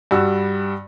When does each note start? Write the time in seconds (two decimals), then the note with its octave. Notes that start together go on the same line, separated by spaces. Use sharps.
0.11 G2 G3 F#4 E6